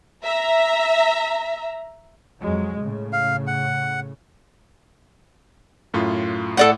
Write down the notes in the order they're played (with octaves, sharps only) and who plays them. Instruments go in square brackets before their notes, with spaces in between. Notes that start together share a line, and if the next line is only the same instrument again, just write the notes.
[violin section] E5 A#5
[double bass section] F2 F#3 G#3
A2 C#3
[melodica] F5
F#5
[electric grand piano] F#2 A2 F4
[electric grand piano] A2 [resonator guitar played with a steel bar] A4 D5 F#5